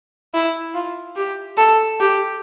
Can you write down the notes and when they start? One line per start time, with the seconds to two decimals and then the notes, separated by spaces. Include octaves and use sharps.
0.34 E4
0.74 F4
1.16 G4
1.57 A4
2.00 G4